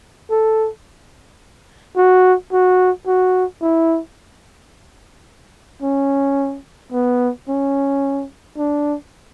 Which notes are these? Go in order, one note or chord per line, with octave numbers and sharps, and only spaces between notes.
A4
F#4
F#4
F#4
E4
C#4
B3
C#4
D4